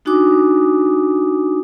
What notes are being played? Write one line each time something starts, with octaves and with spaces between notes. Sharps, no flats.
D4 D#4 F#4 G#5 D6 D#6